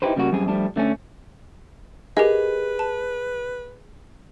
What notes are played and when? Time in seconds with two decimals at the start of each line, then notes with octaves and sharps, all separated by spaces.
0.02 D#4 E4 F#4 G4 B4 C5
0.16 C#3 G3 A#3 F#4
0.32 F#2 G3 C4 G#4
0.48 F3 G3 A3 D4
0.76 D3 A3 C4 C#4
2.17 G4 G#4 A#4 B4 D#5
2.79 A5